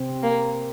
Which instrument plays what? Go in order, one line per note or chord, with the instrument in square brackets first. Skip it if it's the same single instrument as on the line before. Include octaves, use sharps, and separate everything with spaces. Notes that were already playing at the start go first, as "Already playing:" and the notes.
Already playing: [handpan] C3 C4
[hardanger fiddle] A#3